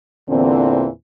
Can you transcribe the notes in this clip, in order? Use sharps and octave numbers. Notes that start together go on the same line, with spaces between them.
E2 A#2 D3 E3 C4